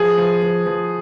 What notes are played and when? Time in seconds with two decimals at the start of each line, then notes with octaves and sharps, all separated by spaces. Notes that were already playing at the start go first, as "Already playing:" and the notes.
Already playing: F3 G#4 B4
0.18 F3
0.42 F3
0.66 F3